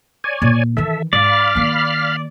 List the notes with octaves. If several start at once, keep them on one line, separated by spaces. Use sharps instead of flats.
C#5 D5 G#5
A#2 F4
D#3 E3 A4 E5
G#2 D5 F5 B5 F6
D#3 A#3